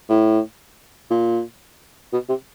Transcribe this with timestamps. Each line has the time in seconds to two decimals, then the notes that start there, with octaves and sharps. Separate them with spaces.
0.09 A2
1.11 A#2
2.13 B2
2.29 C3